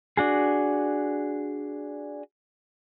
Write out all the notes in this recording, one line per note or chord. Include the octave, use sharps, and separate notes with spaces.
D4 F#4 G#4